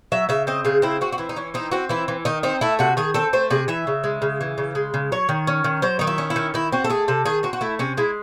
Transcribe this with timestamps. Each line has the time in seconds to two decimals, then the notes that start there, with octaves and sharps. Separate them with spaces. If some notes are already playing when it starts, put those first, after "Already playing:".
0.12 F#3 E5
0.29 C#3 E5
0.47 C4 D#5
0.65 C#3 G#4
0.82 C4 E4
1.01 C4 F#4
1.13 F#4
1.18 E3 E4
1.29 D#4
1.36 E3 C#4
1.54 C4 D#4
1.72 C4 F#4
1.89 E3 E4
2.08 E3
2.25 D#3 D#4
2.43 C4 D#4
2.61 A3 E4
2.79 C3 F#4
2.97 D#3 G#4
3.14 C4 A4
3.33 A3 C5
3.51 C3 G#4
3.68 E3 E5
3.87 C#3
4.04 G#3
4.22 C#3
4.41 E3
4.58 C#3
4.75 G#3
4.94 C#3
5.12 F#3 C#5
5.29 D#3
5.47 C#4
5.64 D#3
5.82 F#3 C5
5.99 D#3 D#4
6.07 E4
6.18 C#4
6.30 E4
6.36 D#3
6.54 D#3 E4
6.72 C4 F#4
6.84 A4
6.90 A3 G#4
7.08 C3 A4
7.26 D#3 G#4
7.43 C4 F#4
7.53 F#4
7.61 A3 E4
7.79 C3 C#4
7.97 G#3 E4